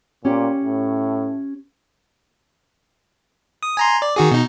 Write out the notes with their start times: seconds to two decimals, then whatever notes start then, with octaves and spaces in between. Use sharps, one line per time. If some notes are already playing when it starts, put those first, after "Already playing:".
0.25 A#2 C#4 G4 G5
0.63 A2
3.63 D#6
3.77 G#5 A#5 C6
4.02 D5
4.16 D#3 F#4 G#4
4.31 B2 D#4